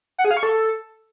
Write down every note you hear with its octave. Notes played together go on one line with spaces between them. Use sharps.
F#5
G#4
F5
C#6
A4